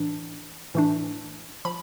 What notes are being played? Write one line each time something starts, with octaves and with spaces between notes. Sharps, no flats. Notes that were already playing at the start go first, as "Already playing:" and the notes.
Already playing: A2 E3 D4
A2 E3 A3 D4
F3 B5